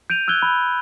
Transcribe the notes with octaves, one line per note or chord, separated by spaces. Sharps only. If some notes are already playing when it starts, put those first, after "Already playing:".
G6 D7 D#7 F7
E6 F#6 G#6 G7
B5 E6